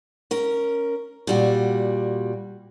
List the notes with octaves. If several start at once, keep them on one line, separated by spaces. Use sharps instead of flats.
C#4 A#4
A#2 G3 F#4